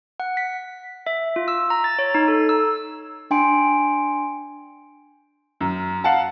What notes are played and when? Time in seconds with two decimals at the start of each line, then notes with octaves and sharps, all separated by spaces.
0.20 F#5
0.37 B6
1.06 E5
1.36 F4
1.48 E6
1.70 A#5
1.84 A6
1.99 C#5
2.15 D#4
2.28 A4
2.49 E6
3.31 D4 G5 G#5 C6 D7
5.61 F#2
6.04 F5 F#5 A5